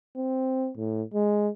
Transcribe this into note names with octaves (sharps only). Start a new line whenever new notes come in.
C4
A2
G#3